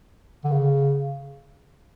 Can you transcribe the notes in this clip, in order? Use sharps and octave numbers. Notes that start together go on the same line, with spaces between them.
D3
C#3